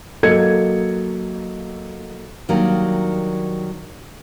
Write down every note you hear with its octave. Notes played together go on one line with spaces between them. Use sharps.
F#3 A#3 A4 D#5 G#6 C#7
D#3 F#3 G3 A#3 D4